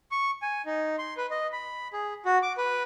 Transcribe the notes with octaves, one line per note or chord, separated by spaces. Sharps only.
C#6
G#5
D#4
C6
B4
D#5
B5
G#4
F#4
D6
B4